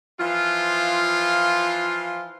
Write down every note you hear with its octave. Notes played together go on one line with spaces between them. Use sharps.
E3 F3 F4